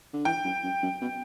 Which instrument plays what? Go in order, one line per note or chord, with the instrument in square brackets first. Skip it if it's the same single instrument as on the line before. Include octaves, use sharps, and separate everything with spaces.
[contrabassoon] D3
[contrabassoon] E3 [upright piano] G5
[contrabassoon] F#2
F#2
F#2
B2